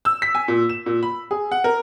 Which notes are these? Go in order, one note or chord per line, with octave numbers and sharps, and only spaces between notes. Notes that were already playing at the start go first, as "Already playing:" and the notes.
E6
B6
G#5
A#2
E7
A#2
B5
G#4
F#5
A#4